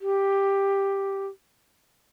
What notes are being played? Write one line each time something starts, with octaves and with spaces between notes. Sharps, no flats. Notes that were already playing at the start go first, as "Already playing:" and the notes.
G4